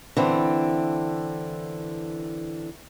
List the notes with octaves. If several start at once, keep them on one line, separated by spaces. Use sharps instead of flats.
D3 E3 C4